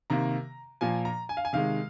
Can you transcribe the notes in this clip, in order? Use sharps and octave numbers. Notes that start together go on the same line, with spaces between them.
C3 D#3 A#3 A#5
A#2 F3 A#3 G#5
A#5
G#5
F5
G#5
C3 D#3 G#3 F5